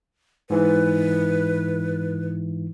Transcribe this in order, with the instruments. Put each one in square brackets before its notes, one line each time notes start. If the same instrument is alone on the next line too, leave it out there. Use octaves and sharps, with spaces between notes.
[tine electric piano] G#2 E3 [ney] B4